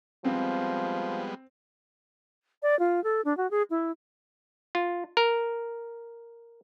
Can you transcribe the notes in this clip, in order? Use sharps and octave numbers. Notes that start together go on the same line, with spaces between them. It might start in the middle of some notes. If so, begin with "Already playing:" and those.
F3 G3 G#3 B3 C4
D5
F4
A4
D4
F#4
G#4
E4
F4
A#4